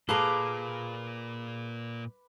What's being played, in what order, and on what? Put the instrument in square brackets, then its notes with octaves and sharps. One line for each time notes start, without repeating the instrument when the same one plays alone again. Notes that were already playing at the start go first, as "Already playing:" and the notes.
[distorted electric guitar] A#2 [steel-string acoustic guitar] G#4 F5 A#5 [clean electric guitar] A4 [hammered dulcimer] B4 D6